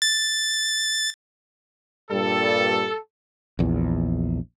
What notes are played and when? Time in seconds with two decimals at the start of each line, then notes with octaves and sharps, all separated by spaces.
0.02 A6
2.11 G2 A#2 G3 A4
3.59 A#1 E2